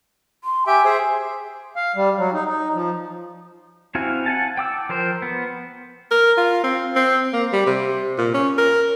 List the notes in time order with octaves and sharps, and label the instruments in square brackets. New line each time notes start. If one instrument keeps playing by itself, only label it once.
[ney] C6
[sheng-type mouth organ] G4 E5 G5 [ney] G#5
[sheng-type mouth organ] G#4 C5 E5
[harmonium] F5
G3
F#3
D#4
D#4
F3
[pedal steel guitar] C4 E4 F#4 F5 G#5
F#5 G#5 A5
G5 D6 E6
F3 A#4 C5
B3
[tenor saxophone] A#4
F4
C4
C4
A#3
G3
C3
A#2
C#4
A#4